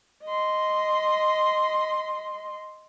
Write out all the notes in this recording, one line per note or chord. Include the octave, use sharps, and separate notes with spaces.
D#5 C6